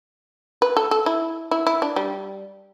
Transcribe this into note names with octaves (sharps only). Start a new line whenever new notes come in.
B4
A4
A4
E4
E4
E4
D4
G3